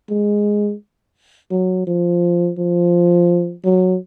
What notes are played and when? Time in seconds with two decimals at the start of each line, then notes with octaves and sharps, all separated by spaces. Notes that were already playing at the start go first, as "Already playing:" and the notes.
0.10 G#3
1.51 F#3
1.87 F3
2.58 F3
3.65 F#3